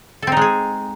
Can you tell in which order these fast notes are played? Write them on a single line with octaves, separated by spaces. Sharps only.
A4 C4 D#4 G#3 G#4